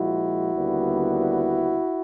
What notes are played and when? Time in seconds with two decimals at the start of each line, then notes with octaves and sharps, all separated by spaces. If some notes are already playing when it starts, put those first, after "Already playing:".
Already playing: A#2 F3 G#3 E4 F#4
0.54 D#2 D3 G3 B3